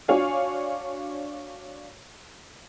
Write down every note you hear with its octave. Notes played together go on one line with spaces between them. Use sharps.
D4 F#4 C#5 F5 G#5